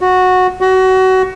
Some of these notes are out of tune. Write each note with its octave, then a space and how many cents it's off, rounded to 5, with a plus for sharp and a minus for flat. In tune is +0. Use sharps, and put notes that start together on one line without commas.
F#4 -10
F#4 +25